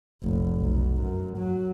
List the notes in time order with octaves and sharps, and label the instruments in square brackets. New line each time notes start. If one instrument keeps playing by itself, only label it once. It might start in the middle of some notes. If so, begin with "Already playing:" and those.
[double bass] F1 A#1
B1
F#2
F#3